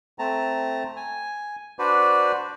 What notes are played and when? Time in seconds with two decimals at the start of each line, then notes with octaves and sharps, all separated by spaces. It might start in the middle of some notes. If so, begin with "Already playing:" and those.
0.19 A3 C4 A5 A#5
0.96 G#5
1.79 D4 F#4 B4 C5 D5